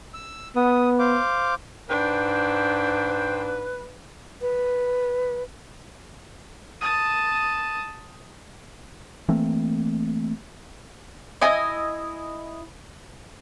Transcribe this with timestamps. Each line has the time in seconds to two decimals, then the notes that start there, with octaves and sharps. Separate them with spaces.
0.14 E6
0.56 B3 D#6
0.99 C5 F5 D6
1.89 G#2 D4 B4 C5 G5
4.41 B4
6.81 A5 D#6
9.29 E3 A3 A#3 C4
11.41 E4 D#5 G#5